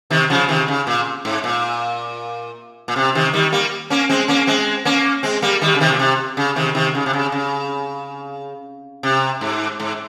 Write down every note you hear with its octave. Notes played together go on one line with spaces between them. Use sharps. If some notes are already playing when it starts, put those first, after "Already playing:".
C3 D#3
C#3 F3
C3 D#3
C#3
A#2
G#2
A#2
A#2
C3
C3 D#3
D#3 G3
G3 A#3
A#3 C#4
G#3 C4
A#3 C#4
G#3 C4
A#3 C#4
G#3 C4
G3 A#3
D#3 G3
C#3
C3 D#3
A#2
C3
C#3
C3 D#3
C3 D#3
C#3
C3
C#3
C#3
C3
G#2
G#2